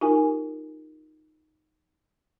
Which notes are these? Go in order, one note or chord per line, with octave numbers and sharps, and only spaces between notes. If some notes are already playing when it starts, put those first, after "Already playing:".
D#4 F4 G4 A#4 G#5